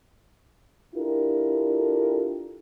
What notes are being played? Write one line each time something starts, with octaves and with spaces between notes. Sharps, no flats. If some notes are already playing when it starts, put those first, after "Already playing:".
D4 E4 F4 G4 A4 A#4